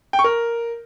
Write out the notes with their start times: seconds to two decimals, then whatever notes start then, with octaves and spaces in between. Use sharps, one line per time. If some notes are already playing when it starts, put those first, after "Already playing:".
0.13 G5
0.19 C#6
0.24 A#4